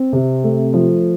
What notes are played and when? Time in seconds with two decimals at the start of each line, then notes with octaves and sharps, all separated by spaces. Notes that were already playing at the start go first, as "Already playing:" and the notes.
Already playing: C4
0.13 C3
0.44 A3
0.74 F3